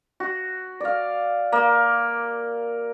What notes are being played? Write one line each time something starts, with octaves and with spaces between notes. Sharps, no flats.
F#4
D5 F5
A#3